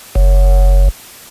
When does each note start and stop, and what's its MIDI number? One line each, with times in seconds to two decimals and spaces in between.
0.15 0.88 30